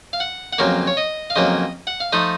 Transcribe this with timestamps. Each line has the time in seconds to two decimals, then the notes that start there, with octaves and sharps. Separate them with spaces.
0.13 F5
0.20 F#5
0.53 F#5
0.58 F2 C#3 F#3 A#3 F5
0.87 C#5
0.97 D#5
1.30 F5
1.35 F2 C#3 F#3 A#3 D#5
1.87 F#5
2.00 F5
2.12 F3 A3 D#4 D#5